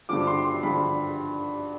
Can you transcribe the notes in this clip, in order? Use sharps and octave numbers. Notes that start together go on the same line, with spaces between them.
G2 D3 F3 D6
C6
C6
G2 D3 F3 B5